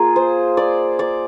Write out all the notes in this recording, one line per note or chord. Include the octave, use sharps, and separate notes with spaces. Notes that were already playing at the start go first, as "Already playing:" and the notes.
Already playing: A#3 F4 G#4
C5
D5
D5